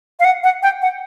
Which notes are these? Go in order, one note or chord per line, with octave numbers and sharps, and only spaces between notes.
F5
F#5
F#5
G5
F#5